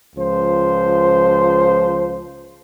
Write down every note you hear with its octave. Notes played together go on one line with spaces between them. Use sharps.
C#2 F3 C5